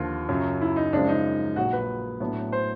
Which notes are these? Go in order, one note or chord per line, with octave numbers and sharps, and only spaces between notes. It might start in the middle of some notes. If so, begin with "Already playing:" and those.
Already playing: D#2 D3 F3 F4
F#2 C#3 F#3
E4
D#4
F#2 C#3 F3 G#3 C4 D4
D#4
A#1 A#2 F#3 F#4
B4
A2 F#3 B3 D4
C5